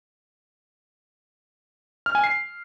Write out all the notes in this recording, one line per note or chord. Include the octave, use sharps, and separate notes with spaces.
F6
G#5
C7